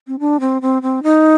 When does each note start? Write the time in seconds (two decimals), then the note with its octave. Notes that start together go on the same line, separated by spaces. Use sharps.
0.08 C4
0.20 D4
0.40 C4
0.62 C4
0.82 C4
1.03 D#4